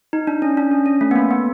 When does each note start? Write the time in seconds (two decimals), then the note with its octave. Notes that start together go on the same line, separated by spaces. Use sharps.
0.13 D#4
0.27 D4
0.42 C#4
0.57 D4
0.71 C#4
0.86 C#4
1.01 A3
1.11 B3
1.16 A#3
1.31 B3